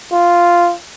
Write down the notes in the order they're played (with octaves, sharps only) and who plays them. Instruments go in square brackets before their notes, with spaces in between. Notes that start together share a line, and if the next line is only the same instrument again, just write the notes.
[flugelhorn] F4